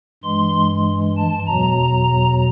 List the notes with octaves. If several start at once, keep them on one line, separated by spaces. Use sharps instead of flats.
G2 E3 G#3 C6
A5
E2 B2 F#3 A#5